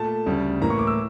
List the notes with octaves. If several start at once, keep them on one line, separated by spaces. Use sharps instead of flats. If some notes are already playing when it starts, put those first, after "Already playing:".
Already playing: A#2 A3 A5
D2 C#3 G3
A2 E3 A#3 A#5
C#6
D6
E6